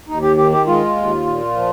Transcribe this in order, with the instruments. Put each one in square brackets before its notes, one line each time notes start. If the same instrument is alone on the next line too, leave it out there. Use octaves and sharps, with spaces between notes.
[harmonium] D#2 D#4
G4
D#3 G4
G4
G#3 F4
D#2
A#2
F3